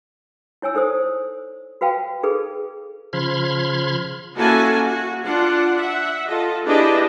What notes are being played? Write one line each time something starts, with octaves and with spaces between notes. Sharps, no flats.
E4 C#5 G#5 E6
D#4 A4 C5 D#6
F#4 B4 F5 G5 A5
D#4 G#4 A4 B4
C#3 F3 B5 C6 F6 G#6
A#3 C#4 E4 F#4 A4 G#5
F#4
D4 F4 F#5
E5 F#5
F4 A4 D#5
B3 D4 E4 G4 G#4 D#5